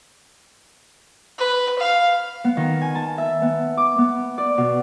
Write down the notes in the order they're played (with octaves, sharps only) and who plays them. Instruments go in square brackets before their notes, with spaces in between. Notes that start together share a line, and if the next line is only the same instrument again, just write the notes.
[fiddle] B4
F5
[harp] B3
D#3
G#5
A5
E5
B3
D6
B3
D5
B2